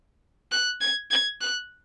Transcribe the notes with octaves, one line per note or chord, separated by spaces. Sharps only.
F#6
G#6
G#6
F#6